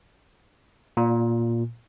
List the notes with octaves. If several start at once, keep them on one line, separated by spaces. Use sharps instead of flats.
A#2